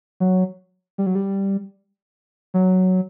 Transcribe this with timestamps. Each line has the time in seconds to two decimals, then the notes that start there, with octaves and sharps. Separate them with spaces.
0.20 F#3
0.98 G3
1.06 F#3
1.15 G3
2.54 F#3